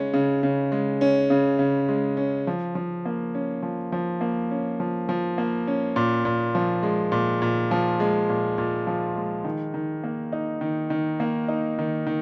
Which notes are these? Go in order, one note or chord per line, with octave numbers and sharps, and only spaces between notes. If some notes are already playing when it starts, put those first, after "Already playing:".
Already playing: C#3 G#3 C#4
C#3
C#3
G#3
C#4
C#3
C#3
G#3
C#4
F3
F3
A#3
C#4
F3
F3
A#3
C#4
F3
F3
A#3
C#4
A#2
A#2
F3
G#3
A#2
A#2
F3
G#3
A#2
A#2
F3
G#3
D#3
D#3
A#3
D#4
D#3
D#3
A#3
D#4
D#3
D#3